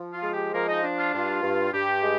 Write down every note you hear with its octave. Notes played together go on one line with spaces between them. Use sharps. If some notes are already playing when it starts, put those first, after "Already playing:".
Already playing: F3
F4
G#3
G4
F3 A#3 A#4
D#4 D#5
D4
F4
G2 F4
G2
G2 G4
G#3